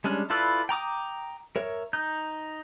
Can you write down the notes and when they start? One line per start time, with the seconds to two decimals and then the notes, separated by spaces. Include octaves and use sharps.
0.04 G3 G#3 C#4 D4
0.30 E4 F4 A4 B4 D5
0.69 G5 A#5 D6 D#6
1.56 A#4 C#5 E5
1.93 D#4 G6